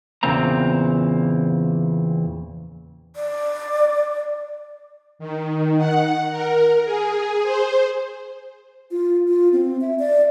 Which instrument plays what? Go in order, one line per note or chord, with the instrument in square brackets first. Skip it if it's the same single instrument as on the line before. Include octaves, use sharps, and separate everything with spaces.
[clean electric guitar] E2 A#2 C#3 A#3 C4 A#5
[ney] D5
[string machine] D#3
F#5
A#4
G#4
C5
[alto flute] F4
F4
C4
E5
D5